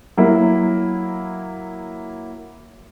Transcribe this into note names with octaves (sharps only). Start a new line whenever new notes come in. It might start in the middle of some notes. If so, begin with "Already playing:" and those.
F#3 A#3 E4